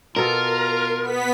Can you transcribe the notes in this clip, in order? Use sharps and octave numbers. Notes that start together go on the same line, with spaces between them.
B2 F4 A4 A#4
B3 B6